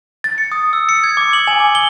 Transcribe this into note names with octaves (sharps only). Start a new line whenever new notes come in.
A6
C#7
D#6
E6
C#7
G#6
D6
F#7
G#5
D6
G7